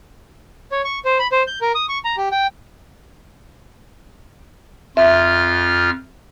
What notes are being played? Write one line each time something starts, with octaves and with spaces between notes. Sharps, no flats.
C#5
C#6
C5
B5
C5
G6
A#4
D#6
C#6
A#5
G4
G5
F2 F4 E5 F6